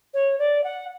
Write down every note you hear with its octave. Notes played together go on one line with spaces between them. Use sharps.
C#5
D5
F#5